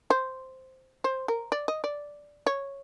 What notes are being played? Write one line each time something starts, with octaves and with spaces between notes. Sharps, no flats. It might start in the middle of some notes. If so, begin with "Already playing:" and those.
C5
C5
A#4
D5
D#5
D5
C#5